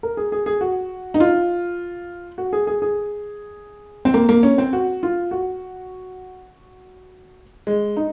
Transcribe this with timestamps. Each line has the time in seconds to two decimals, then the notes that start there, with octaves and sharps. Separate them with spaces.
0.03 A#4
0.17 G#4
0.32 G#4
0.46 G#4
0.61 F#4
1.14 D#4
1.20 F4
2.38 F#4
2.53 G#4
2.67 G#4
2.82 G#4
4.05 C4
4.14 A#3
4.29 A#3
4.43 C#4
4.58 C4
4.73 F#4
5.03 F4
5.31 F#4
7.67 G#3
7.97 D#4